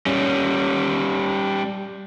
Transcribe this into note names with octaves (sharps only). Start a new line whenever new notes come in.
G3 C#4